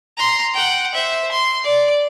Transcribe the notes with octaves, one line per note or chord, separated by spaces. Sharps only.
A#5 C6
F#5 G5
C5 E5
C6
D5